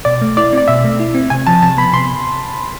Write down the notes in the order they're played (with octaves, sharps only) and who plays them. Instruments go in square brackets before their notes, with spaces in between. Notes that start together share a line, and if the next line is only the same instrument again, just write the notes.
[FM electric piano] B2 [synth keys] D5
[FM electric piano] A3
[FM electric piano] E4 [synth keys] D5
[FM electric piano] C4 [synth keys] D5
[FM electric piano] B2 [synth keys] E5
[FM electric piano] A3
E4
C4
[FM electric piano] C3 [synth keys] G#5
[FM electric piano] F3 [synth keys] A5
[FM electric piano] C3 [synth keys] A5
[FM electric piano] B3 [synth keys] B5
[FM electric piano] C3 [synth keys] C6